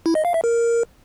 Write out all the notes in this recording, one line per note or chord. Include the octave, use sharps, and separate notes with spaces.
E4
D#5
F5
E5
A#4